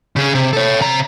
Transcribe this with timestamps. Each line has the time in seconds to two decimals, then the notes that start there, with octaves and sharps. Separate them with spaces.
0.16 C#3 G#4
0.35 C3
0.53 A4 C#5
0.81 C3 A#5